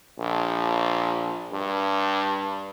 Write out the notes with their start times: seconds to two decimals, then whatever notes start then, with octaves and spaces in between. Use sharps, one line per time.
0.18 A#1
1.53 G2